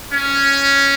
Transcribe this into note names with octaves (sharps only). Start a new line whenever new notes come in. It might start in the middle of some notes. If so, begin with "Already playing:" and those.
C#4